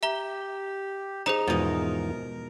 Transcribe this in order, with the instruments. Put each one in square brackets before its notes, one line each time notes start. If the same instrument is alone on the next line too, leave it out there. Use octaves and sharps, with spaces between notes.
[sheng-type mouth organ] G4 [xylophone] E5 A#5 G7
[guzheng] D#4 [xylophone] G#4 C5 A#5
[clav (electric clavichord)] E2 G#2 F3 [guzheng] B2 D#4 [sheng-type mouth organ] A#4